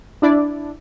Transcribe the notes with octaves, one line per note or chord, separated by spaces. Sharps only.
D4 E4 D5